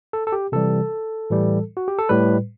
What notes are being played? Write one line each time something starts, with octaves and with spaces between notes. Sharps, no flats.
A4
A4
G4
C3 E3 G3 A4
A2 E3 G3
F#4
G4
A4
A2 G3 B4